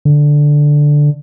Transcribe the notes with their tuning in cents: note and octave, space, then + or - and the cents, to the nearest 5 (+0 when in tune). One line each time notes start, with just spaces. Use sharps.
D3 +0